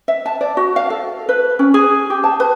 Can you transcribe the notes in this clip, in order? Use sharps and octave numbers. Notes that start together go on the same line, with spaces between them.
E5
A5
D5
F#4
F5
A4
B4
C#4
G#4
G4
A5
B4